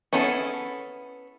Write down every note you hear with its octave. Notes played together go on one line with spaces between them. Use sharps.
B3 C#4 E4 G#4 A4